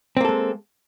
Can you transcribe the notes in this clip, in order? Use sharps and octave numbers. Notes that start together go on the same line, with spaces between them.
G#3 A#3 C4 A4